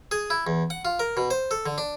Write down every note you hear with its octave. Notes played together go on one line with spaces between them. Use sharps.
G#4
E4
E2
F#5
F4
A#4
B2
C5
A4
D3
D4